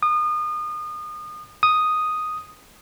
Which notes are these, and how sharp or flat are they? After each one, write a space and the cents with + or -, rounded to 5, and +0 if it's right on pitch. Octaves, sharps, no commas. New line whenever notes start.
D#6 -30
D#6 +0